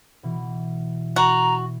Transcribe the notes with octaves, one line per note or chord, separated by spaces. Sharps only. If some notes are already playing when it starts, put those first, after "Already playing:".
B2 E3
F#4 A#5